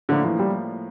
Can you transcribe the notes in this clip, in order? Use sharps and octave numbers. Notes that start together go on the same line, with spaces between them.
A2 D3 F3 A#3
E3
G3